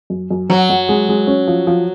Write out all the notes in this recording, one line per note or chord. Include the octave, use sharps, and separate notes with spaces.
F#2
F#2
F#2 F#3
F#2
G#3
G#3
C#4
F3
F3